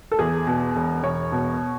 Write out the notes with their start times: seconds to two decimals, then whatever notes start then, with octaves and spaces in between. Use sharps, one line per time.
0.12 A4
0.19 E2 G#4
0.47 B2
0.76 E1
1.03 E1 C#5
1.32 B2